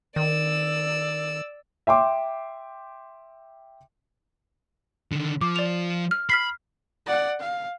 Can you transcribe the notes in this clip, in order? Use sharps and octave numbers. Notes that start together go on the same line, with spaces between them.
D#3 D5 E6
E5 G5 C6 D6
D3 D#3
F3 D6
D5 F7
F6
B5 F6 B6 C7
D5 F#5
F5